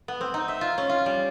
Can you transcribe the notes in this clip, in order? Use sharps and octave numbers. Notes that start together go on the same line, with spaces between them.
B3
C4
D#4
E5
F4
C#4
F4
G3